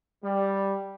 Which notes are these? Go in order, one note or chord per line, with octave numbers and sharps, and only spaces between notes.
G3